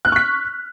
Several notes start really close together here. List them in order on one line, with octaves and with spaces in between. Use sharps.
F#6 F6 C#6 B6